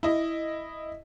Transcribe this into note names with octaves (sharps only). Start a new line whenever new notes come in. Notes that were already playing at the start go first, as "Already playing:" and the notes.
E4 D#5